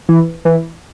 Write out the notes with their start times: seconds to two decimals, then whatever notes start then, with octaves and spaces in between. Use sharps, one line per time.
0.09 E3
0.45 E3